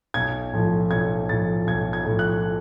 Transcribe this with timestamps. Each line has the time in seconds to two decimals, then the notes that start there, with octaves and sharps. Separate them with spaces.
0.14 B1 G#6
0.53 A2 F3
0.91 B1 G#6
1.29 A2 F3 A6
1.67 B1 G#6
1.93 G#6
2.05 A2 F3
2.19 F#6